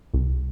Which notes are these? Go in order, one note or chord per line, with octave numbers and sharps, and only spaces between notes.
C2